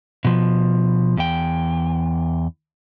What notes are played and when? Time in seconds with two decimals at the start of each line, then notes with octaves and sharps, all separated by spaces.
0.25 B2 F3
1.17 E2 G5